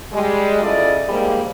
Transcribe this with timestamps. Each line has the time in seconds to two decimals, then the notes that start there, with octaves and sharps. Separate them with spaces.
0.13 G3 G#3
0.62 C#3 E4 F4 A4 D5 D#5
1.09 G#2 F3 G3 G#3 A#3